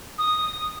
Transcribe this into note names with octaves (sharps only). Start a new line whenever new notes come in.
D#6